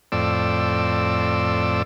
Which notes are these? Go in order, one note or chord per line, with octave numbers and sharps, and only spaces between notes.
F2 A2 C4 D5 E6